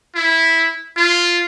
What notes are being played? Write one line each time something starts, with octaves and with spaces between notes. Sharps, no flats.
E4
F4